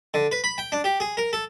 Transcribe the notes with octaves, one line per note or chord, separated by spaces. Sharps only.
D3
B4
B5
G5
D4
G4
G#4
A#4
A4